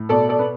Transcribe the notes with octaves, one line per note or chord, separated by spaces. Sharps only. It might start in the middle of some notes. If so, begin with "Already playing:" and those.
Already playing: A2
B2 A4 D5
A4 D5
B3